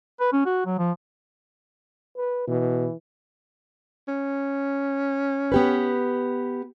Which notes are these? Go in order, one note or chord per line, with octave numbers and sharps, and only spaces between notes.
B4
C#4
F#4
F#3
F3
B4
B2 E3
C#4
B3 G4 B4